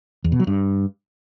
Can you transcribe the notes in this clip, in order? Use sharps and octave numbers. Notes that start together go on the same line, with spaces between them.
E2
B2
F#3
G2